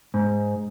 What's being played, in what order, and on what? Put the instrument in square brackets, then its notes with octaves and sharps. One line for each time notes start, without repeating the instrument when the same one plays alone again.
[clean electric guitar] G#2